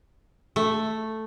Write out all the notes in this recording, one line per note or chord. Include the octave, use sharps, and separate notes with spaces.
A3